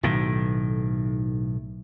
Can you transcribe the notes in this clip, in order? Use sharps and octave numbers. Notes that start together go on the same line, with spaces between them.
B1 A2 D#3